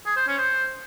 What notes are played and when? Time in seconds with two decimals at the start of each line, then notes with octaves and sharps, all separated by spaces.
0.06 G#4
0.16 C5
0.27 C#4
0.38 C5